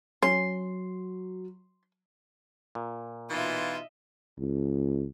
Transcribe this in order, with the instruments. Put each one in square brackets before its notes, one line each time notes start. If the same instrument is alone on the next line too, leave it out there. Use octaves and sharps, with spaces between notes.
[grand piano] F#3 [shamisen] C#4 [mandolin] C6
[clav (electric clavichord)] A#2
[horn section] B2 D#4 F4 [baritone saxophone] E3 [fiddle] D#5 E5
[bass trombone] C#2